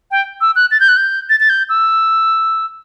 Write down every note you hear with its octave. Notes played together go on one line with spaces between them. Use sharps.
G5
E6
F#6
A6
G6
F#6
G6
A6
A6
G6
E6